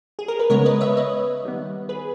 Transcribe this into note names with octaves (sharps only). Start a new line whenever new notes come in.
G#4
A#4
B4
C#3 G#3 B3 A#4 C#5
B4 D#5
C#5 E5
B4 D#5
D#3 G3 B3
G#4 B4